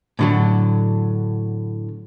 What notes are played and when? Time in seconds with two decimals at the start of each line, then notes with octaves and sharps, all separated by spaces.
0.19 A2 D3 F#3